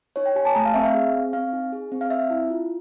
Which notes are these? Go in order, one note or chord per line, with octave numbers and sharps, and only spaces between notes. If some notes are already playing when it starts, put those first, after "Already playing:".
D#4 C#5
G5
G4 G#5
A5
A3 A#5
F5
C4 E5
F5
G#4
C4
C4 F5
D#4
G#4
C4
F5
C4 E5
E4
F4